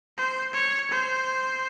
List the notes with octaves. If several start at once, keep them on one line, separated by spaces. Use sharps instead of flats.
C5
C#5
C5